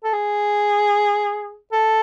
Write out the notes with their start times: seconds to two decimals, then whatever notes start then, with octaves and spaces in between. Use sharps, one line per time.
0.04 A4
0.13 G#4
1.72 A4